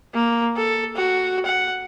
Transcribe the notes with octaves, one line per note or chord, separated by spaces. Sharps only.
A#3
A4
F#4
F#5